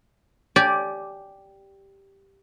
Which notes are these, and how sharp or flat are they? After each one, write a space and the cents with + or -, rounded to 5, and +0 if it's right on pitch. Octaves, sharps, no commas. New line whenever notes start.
G4 +0 D5 -5 G#5 +25